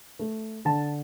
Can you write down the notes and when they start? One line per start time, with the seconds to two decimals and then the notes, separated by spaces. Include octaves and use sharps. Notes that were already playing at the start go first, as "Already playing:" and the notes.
0.19 A3
0.65 D3 A5